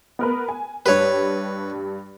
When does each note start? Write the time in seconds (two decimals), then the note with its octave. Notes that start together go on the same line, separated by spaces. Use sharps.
0.19 B3 A#4 B4
0.49 G#5
0.86 G2 G4 B4 C#5